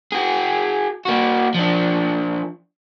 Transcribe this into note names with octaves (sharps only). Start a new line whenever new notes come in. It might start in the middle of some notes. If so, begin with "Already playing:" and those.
F#4 G#4
A#3 F#4
F3 D4